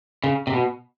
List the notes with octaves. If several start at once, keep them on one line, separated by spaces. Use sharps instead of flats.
C#3
C3
B2